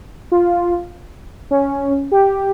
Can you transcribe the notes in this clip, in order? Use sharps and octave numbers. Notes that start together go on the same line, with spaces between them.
F4
C#4
G4